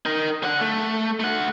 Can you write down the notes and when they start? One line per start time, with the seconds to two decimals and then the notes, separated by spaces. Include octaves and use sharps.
0.05 D#4 A#4
0.43 D3 F#5
0.61 A3
1.20 A3 F#5